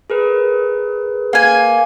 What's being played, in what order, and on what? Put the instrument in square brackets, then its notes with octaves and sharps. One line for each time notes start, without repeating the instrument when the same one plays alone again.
[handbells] G#4 A#4 B4
[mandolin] A#3 G#5